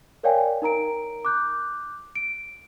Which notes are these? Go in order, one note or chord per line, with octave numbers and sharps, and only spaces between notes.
A#4 C#5 D5 F5 G5 G#5
D#4 A#4 A#5 D7
D6 F#6 G6
D7